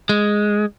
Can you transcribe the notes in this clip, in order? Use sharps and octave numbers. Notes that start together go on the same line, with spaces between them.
G#3